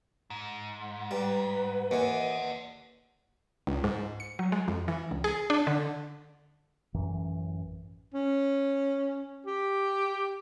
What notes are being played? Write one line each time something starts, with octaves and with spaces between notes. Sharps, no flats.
G#2
G3 B4
D#2 E3 D5 D#5 F#5
C#2
G#2
C#7
F#3
G#3
F2
E3
C#2
G#4
D4
D3
A1 F#2 E3
C#4
G4